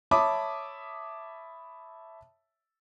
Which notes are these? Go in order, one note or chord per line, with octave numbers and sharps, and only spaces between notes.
C#5 E5 A5 B5 D6 D#6